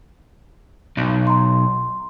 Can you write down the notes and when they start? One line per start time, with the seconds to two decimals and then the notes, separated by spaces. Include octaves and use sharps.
0.97 B1
1.27 A#5 C6